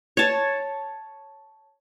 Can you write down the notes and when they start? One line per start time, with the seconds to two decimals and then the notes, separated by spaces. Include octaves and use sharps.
0.17 C#5 A5